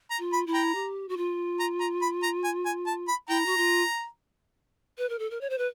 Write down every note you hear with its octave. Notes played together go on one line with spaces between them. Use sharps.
A#5
F4
B5
E4
G5 A#5
G4
F#4
F4
A#5
A#5
B5
A#5
G#5
G#5
A5
B5
E4 G5 A#5
F#4
F4
B4
A#4
A4
A#4
C#5
C5
B4